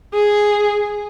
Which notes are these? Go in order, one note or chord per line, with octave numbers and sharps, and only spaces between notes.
G#4